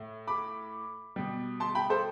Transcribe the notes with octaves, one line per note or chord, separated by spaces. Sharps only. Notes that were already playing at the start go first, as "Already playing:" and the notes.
Already playing: A2
B5 D6
B2 G3
A5 C6
G5 B5
A4 C5